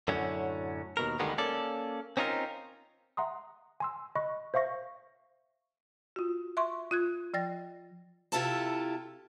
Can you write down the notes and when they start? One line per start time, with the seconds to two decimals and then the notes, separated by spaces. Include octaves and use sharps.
0.08 F#2 A2 D3 F#3 C#4
0.97 D#2 B2 A#4
1.19 D2 D3 D#3 G3 G#3 B3
1.38 A#3 C#4 A4 D5
2.17 C4 C#4 D#4 F4 A#4
3.17 E5 F#5 A#5 C6 D#6
3.80 G#5 C6 E6
4.15 D#5 B5 C#6 F#6
4.54 C5 E5 F5 C#6 A#6
6.16 F4 F#4
6.57 E5 C6 C#6
6.91 F4 F#6 G#6
7.34 F3 D5 G5 A6 A#6
8.32 C3 E4 F4 G4 A4 A5